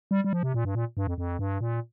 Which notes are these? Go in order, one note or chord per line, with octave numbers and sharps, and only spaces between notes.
G3
G3
F3
C3
A#2
G2
A#2
G2
F2
F2
G2
A#2